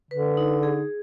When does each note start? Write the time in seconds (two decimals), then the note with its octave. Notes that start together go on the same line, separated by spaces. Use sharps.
0.11 D3 B4
0.37 D#4
0.63 G#4